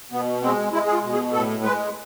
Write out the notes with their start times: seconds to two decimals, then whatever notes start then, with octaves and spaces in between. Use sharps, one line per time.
0.12 B2 B3
0.42 G#3 C4
0.73 G#3 E4
0.86 G#4
0.93 F4
1.03 B2
1.13 G#4
1.33 A2 A4
1.63 G#3 B4